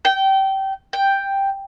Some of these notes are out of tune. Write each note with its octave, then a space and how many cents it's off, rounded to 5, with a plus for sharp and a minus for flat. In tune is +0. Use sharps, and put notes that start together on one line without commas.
G5 -20
G5 +5